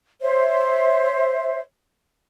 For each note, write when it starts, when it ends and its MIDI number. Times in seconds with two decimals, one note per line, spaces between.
0.21 1.60 72
0.21 1.60 73
0.21 1.60 76